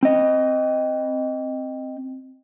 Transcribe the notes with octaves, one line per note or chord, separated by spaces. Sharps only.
C4 D#5